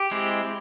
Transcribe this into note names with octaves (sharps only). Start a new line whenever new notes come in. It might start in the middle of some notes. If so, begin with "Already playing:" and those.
Already playing: G4
G#3 C4 E4